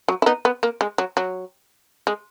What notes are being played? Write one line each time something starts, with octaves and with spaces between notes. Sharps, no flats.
F#3
E4
B3 D#4
B3
A#3
G#3
F#3
F#3
G#3